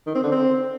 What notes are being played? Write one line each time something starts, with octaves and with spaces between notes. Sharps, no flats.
D#3
C4
D3
C4